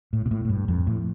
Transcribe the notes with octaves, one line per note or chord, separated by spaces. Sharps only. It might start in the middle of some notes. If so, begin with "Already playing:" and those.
A2
B2
A2
A2
G2
F2
A2